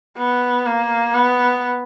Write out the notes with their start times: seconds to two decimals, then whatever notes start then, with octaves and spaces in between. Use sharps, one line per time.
0.18 B3
0.66 A#3
1.14 B3